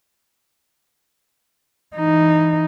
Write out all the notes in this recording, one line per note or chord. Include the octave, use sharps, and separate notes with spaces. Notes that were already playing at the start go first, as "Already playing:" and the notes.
E3 D#4